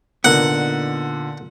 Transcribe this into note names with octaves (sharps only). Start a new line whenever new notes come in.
A#2 D3 B3 D#4 A#4 F#5